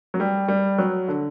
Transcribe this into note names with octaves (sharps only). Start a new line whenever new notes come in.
F#3
G3
G3
F#3
D3